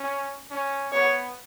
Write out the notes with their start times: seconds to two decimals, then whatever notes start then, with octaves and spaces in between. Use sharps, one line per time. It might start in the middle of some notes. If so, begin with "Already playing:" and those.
Already playing: C#4
0.51 C#4
0.92 B3 C#5